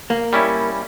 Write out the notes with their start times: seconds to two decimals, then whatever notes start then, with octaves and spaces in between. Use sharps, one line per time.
0.10 A#3
0.33 G3 C#4 E4